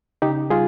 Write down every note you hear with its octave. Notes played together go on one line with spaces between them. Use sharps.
C#3 D#4 G4
G3 F4 G#4